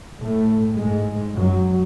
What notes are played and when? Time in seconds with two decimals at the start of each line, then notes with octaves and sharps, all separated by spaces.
0.21 A2 A3
0.78 G#2 G#3
1.37 F#2 F#3